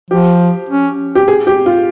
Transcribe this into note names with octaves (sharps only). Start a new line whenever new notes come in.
F3 G4
C#4
G4
G#4
G4
F4